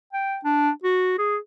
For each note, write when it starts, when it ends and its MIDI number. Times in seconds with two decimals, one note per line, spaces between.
0.13 0.38 79
0.44 0.70 62
0.83 1.16 66
1.18 1.37 68